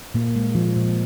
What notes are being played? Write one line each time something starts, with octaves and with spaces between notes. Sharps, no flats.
A#2 A#3
G#3
F3
A#2